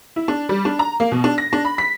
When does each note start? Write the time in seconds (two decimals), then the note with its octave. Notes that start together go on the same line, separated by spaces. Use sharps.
0.16 E4
0.28 D4
0.49 G3
0.65 D4
0.79 A#5
1.00 A#3
1.11 B2
1.24 D4
1.38 A#6
1.53 D4
1.65 B5
1.78 B6